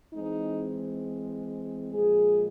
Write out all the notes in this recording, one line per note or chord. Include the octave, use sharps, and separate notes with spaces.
E3 G#3 C4 D#4
A#2 F3 G#3 G#4